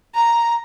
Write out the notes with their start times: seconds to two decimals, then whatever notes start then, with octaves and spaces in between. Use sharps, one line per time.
0.14 A#5